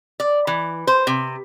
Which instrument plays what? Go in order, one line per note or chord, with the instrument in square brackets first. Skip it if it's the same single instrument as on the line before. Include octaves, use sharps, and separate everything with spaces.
[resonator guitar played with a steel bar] D5
E3
C5
C3